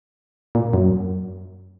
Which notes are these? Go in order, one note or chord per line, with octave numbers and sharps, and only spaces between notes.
A#2
F#2